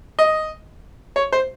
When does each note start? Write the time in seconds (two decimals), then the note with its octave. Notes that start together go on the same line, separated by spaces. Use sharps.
0.19 D#5
1.16 C#5
1.32 C5